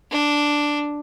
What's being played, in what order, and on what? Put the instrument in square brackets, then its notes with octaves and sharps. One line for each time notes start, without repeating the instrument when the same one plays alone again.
[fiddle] D4